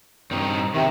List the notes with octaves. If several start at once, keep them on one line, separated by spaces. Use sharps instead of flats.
G2 C4 D#4
C3 D#3 C4